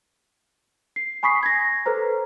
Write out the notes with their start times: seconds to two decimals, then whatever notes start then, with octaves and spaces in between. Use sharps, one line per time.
0.96 C7
1.23 G#5 B5 C#6 D#6 B6 C7
1.43 G#6 A#6
1.86 A4 B4 C5 A#5